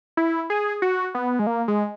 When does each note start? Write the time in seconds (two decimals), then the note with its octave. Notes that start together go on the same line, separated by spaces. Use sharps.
0.17 E4
0.50 G#4
0.82 F#4
1.15 B3
1.39 G#3
1.47 A#3
1.68 G#3